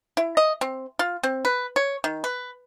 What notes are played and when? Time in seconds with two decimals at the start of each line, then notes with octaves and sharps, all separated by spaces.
0.17 E4
0.37 D#5
0.61 C4
0.99 F4
1.23 C4
1.45 B4
1.76 C#5
2.04 D#3
2.24 B4